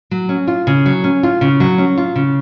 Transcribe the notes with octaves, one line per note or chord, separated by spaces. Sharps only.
F#3
C#4
F4
C#3
F#3
C#4
F4
C#3
F#3
C#4
F4
C#3